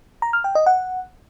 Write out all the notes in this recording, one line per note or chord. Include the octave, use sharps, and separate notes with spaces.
A#5
F6
G5
D#5
F#5